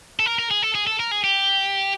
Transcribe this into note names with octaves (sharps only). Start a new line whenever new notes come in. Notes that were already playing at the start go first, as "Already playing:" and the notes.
A4
A#4
A#4
G#4
A4
G#4
A4
A#4
G#4
G4